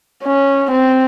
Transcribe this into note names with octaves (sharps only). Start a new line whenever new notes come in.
C#4
C4